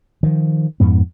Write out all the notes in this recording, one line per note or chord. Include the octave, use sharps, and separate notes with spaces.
D#3 F3
F2 G#2 B3